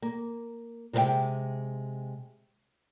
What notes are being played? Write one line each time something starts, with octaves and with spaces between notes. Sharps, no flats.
A#3
C3 G#3 A4 A#4 E5 G5